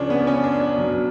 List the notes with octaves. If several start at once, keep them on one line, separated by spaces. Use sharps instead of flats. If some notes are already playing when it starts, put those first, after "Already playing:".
Already playing: C#2 C#3 F3 C#4 D4
B3
C#4
D4
D4
B1 B2 F#3